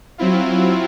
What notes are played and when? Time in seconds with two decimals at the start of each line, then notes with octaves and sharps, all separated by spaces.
0.18 F#3 C4 E4 F4